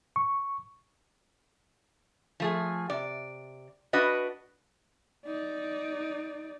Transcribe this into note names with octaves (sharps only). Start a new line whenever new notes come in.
C#6
F3 A3 G#4
C3 D5
D4 F#4 B4 D#5
D#4 D5